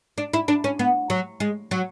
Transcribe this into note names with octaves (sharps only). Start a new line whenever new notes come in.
D4
E4
D4
C#4
B3
F#3
G#3
F#3